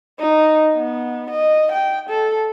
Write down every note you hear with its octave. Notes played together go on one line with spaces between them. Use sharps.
D#4
B3
D#5
G5
A4